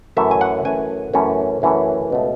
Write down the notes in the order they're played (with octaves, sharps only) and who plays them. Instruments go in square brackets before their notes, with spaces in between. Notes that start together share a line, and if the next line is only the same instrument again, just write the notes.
[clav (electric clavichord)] F#2 E3 A3 C#4 E5
G#5
F#5
F#2 E3 A3 C#4 G#5
F#2 E3 A3 C#4
F#2 E3 A3 C#4
C#2 B2 A3